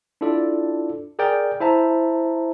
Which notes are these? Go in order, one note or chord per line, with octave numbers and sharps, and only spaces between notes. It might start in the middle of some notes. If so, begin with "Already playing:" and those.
D4 E4 F4 A4 D5
G#4 A#4 D5 G5
E4 C5 E5 A5 A#5